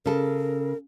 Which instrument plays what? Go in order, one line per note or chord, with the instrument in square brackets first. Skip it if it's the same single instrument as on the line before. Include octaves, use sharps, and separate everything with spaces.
[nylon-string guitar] C#3 A4 [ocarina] A#4